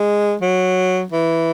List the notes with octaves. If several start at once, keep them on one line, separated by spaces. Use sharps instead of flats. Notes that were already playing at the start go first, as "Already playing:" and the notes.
Already playing: G#3
F#3
E3